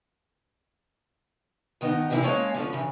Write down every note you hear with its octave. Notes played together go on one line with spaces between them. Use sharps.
G2 D#3 B3 D#4
C3 E3 F3 E4 F4
G#3 A#3 C#4 A4 C#5 F5
D3 F3 C#4
C#3 E3